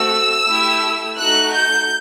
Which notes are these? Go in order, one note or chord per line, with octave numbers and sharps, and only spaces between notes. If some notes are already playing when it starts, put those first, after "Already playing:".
Already playing: A3 C4 F#4 E6
A3 E4 G4
A3 D#4 F#4 F#6
G6